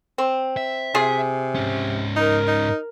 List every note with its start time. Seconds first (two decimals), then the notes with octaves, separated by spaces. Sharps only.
0.18 C4
0.57 E5
0.95 C3 F4 G#4
1.55 G#2 C#4
2.16 D#4 A#4
2.47 D#4